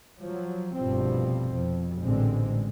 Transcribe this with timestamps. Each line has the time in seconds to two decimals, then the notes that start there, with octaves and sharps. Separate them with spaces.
0.20 F3 F#3
0.74 F1 G2 B2 F3 C4
1.54 F2
2.02 A1 A#2 D3 G#3 C4